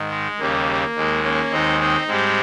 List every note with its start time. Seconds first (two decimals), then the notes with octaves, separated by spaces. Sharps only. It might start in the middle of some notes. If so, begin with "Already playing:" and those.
Already playing: G#2 D#3
0.10 G#3
0.39 D#2 C#3 G3 A#3
0.95 D#2 D#3 G#3
1.23 A#3 C#4
1.51 D#2 D#3 G#3 C4 D#4
1.80 C4 D#4
2.07 G#2 G3 G#3 C4